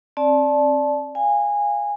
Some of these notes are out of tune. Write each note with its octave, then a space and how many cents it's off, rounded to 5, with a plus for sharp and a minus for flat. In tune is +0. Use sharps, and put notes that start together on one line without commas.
C4 +35 D5 +0 A5 -20
F5 +0 G#5 -20